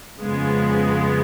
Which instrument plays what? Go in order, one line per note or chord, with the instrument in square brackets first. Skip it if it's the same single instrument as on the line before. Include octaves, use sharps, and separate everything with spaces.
[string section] F2 C#3 G#3 B3